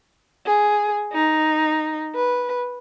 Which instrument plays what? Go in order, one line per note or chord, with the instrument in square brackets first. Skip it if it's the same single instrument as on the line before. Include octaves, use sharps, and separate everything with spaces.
[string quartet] G#4
D#4
B4